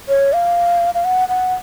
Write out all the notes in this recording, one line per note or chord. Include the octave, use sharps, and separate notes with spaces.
C#5
F5
F5
F#5
F#5